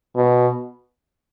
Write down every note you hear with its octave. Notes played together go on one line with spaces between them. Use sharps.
B2